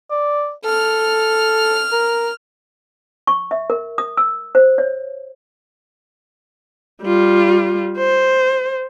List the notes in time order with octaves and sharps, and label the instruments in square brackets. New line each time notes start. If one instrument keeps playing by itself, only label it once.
[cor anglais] D5
[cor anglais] A4 [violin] F6
[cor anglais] A#4
[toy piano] C#6
E5
A#4
D#6
E6
C5
C#5
[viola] G3 F4
C5